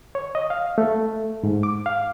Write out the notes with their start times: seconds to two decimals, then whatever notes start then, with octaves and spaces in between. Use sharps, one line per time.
0.15 C#5
0.35 D#5
0.50 F5
0.78 A3
1.44 G#2
1.63 D6
1.86 F5